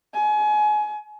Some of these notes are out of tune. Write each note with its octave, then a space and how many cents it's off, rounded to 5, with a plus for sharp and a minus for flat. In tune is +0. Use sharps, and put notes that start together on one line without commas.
G#5 +30